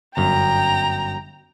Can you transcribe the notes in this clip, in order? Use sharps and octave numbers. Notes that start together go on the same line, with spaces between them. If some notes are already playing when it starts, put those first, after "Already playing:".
G1 F#2 G5 A#5